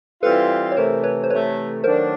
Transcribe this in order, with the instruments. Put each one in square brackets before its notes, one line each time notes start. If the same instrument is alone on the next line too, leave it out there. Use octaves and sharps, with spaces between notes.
[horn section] E3 G3 C4 F4 [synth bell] A4 B4
[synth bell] C#5
[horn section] C3 E3 A3 [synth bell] A#4 C5
[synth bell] B4 C#5
C5
[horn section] C3 E3 A3 [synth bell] B4 C#5
[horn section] D#3 F#3 A3 D4 [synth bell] A#4 C5